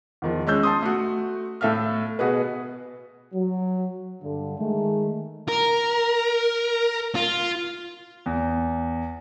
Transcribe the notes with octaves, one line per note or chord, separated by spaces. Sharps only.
E2 D#3 F3
G#3 C#4 E6 G6
A5 C6 D#6
A3 F#4
A2 A4 E5 F5 F6
B2 B3 F#4 G#4 B4
F#3
G2 D3
D#3 G#3 A3
A#4
F4
E2